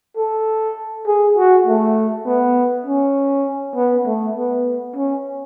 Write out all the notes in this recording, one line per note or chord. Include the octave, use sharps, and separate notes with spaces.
A4
G#4
F#4
A3
B3
C#4
B3
A3
B3
C#4